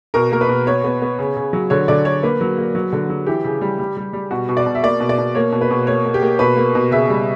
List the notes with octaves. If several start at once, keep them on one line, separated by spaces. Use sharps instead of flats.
B2 A#4
A#3 A#4
B4
B2
B3 C#5
B3
B3
C#3
C#3
F#3
D3 C#5
D3 D5
D3 C#5
A#3 B4
F#3
A#3
F#3
D3
F#3
E3 G4
C#3
G3
G3
G3
G3
B2 F#4
B2
D5
B2
E5
A#3 D5
B2
D5
B2
A#3 C#5
B2
B4
B2
A#3 C#5
A#3
G4
A#3
B2 B4
A#3
B2
C#3 E5
G3